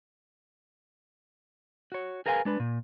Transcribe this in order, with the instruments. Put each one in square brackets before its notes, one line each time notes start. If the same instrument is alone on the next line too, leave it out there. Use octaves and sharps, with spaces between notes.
[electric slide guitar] F#4 C#5
G#4 A#4 B4 F5 G5 G#5
G#3 D4 B4
A#2